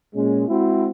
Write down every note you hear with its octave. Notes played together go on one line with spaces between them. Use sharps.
A#2 G#3 C#4
G#3 C4 E4 F#4